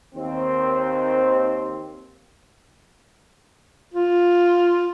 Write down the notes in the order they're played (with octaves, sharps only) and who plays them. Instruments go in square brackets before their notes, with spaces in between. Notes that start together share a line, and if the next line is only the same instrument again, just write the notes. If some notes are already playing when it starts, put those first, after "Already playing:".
[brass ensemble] D#2 C4
[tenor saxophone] F4